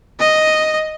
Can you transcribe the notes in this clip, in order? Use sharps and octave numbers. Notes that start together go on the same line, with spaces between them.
D#5